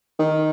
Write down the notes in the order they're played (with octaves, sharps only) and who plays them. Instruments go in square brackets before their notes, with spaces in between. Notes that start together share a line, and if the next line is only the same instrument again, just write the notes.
[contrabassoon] D#3